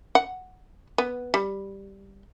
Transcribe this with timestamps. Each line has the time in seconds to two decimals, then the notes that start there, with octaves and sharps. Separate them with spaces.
0.15 F#5
0.98 B3
1.34 G3